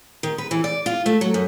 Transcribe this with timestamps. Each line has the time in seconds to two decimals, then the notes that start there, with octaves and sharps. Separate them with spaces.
0.23 D#3
0.38 B4
0.51 E3
0.64 D5
0.86 F4
1.06 A3
1.21 F#3
1.34 F#2